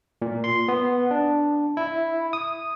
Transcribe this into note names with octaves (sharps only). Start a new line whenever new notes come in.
A#2
C6
B3
D4
E4
D#6